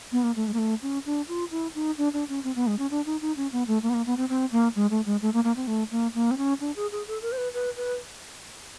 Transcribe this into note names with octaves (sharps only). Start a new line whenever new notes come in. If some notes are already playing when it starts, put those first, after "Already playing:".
B3
A#3
A3
G#3
A#3
A3
C#4
D4
F4
E4
D#4
D4
D4
C#4
C4
B3
G#3
C#4
D4
D#4
D#4
C#4
B3
A3
A#3
B3
A#3
B3
C4
C4
A#3
G#3
A3
G#3
A3
A#3
A#3
C4
A3
A#3
A#3
C4
C#4
D4
G#4
G#4
A4
A#4
C5
B4
B4
B4